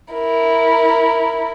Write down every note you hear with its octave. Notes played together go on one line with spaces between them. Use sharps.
E4 A#4